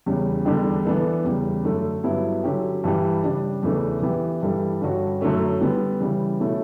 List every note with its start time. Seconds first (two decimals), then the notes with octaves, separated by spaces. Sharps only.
0.06 E2 C#3 G3 C#4
0.45 E2 D3 G3 D4 G4
0.85 E3 B3 D4 A4
1.24 E2 C#3 G3
1.64 F#2 D3 A3
2.04 G2 F#3 B3 E4 G4
2.44 D3 F#3 C#4 G4
2.84 G2 E3 G3
3.23 C#3 G3 D4
3.63 E2 C#3 E3 A3 D4
4.02 E3 B3 E4 G4
4.42 G2 E3 G3 D4 A4
4.82 G2 D3 G3 C#4 F#4
5.21 F#2 D3 F#3 A3 C#4
5.61 D3 G3 B3
6.00 C#3 E3 G3
6.41 B2 A3 C#4 E4 A4